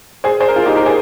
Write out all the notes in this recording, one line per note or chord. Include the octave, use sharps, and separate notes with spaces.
G#4 C5
G#4 C5
A#4
F4 G#4
D#4 G4
G4 A#4
G#4 C5